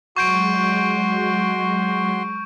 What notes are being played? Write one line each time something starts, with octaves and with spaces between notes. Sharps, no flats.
F#3 G#3 F#4 C6 C#6 G6 D7